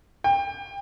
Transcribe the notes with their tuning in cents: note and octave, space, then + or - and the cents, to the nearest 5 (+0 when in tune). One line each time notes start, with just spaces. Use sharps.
G5 +25